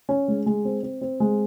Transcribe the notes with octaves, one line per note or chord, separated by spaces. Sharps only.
C#4
G#3
G#3
C4
C4
C4
G#3